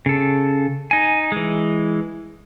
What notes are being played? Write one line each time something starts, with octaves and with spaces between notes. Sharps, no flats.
C#3 A4
D#4 G#5
E3 G#3